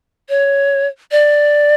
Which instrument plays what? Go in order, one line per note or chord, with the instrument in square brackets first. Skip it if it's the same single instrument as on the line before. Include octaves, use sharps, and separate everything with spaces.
[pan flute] C#5
D5